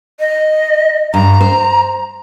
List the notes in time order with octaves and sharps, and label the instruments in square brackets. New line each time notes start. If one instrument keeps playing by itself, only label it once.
[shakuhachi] D#5
[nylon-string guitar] G2 [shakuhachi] A#5
[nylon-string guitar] C5